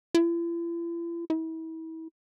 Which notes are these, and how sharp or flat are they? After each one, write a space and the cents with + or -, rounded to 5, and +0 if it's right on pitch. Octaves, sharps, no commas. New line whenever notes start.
E4 +45
E4 -35